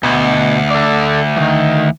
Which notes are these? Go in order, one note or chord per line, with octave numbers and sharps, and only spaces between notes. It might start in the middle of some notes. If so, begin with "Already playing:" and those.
D2 B2
A4 D5
D#3 E3